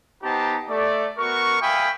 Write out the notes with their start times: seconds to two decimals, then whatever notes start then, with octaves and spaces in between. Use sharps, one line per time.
0.23 B3 D#4 G4 C5 A5 A#5
0.69 A3 D5
1.18 B3 F#4 A#4 C#6
1.62 E5 F5 G5 G#5 B5 D#6